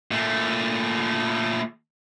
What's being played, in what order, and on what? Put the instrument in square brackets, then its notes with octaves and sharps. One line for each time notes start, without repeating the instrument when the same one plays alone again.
[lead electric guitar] A#2 A3